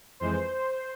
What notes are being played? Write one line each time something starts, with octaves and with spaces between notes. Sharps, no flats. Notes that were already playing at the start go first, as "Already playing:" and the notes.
F2 E3 G#3 C5